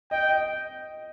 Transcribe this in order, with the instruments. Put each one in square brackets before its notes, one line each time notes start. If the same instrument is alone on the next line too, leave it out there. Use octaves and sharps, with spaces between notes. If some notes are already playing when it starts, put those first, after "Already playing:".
[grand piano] D#5 [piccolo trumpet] G5
[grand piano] D#5